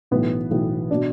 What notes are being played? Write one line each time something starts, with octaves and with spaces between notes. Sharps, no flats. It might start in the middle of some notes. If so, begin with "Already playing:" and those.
B1 A2 E3 B3
B1 A2 E3
B2 D4